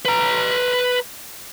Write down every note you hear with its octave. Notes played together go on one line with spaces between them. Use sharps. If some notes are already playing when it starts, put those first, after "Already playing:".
B4 A#5